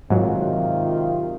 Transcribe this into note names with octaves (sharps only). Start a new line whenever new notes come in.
G#2 C3 D#3 F#3 F4